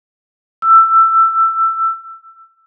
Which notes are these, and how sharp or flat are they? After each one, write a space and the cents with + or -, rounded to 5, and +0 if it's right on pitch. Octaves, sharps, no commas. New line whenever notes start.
E6 +15